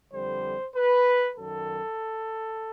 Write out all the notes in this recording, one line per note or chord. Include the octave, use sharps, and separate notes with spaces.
F2 D3 G3 C5
B4
F#2 D#3 F#3 A4